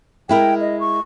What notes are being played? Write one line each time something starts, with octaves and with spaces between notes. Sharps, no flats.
G#3 E4 A#4 G5
D#5
C#6